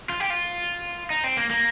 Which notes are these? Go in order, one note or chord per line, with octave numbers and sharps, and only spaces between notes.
F4
G4
F4
D#4
C4
A#3
A#3